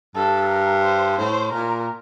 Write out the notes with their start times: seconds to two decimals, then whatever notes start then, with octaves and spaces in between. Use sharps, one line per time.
0.15 G2 A4
0.49 A#4
0.83 C5
1.17 A2 C5
1.52 A#2 A#4